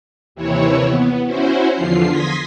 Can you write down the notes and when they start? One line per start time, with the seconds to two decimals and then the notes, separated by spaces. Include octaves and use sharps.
0.35 D#2 C3 E3 E4 C#5
0.84 B3
1.26 C#4 E4 F#4 C5
1.73 E2 D3 F3 F4 C7
2.10 C6 D#6 G#6 A#6 B6